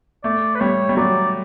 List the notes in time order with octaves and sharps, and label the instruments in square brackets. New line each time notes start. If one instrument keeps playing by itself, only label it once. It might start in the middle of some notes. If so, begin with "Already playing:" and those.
[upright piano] A3 [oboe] D5
[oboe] B4
[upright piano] G3 [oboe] C#5
[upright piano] G3
[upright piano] F#3 [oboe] D5